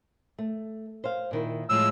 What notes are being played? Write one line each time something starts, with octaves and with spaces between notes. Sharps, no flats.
A3
C5 F5
A#2 D#3 E4
A2 F3 G#3 E6